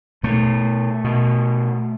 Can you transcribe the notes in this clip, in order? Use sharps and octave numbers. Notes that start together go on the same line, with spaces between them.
B2 A3
B2